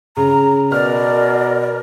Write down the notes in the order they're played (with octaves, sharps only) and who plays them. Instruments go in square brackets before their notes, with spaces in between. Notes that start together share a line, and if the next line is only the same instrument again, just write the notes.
[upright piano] C#3 [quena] A#5
[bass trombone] B2 [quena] A#4 [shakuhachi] D5 [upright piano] F6